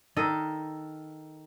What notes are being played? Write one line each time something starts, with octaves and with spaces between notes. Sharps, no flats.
D#3 A4 D#5